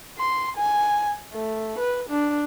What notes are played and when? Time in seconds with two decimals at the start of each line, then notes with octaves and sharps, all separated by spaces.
0.18 C6
0.57 G#5
1.34 A3
1.79 B4
2.10 D4